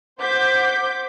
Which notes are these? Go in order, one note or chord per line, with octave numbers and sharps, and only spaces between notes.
C5 F#5 D6 G6 B6